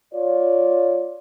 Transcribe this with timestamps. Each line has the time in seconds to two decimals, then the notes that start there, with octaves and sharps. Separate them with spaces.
0.14 F4 C#5 D5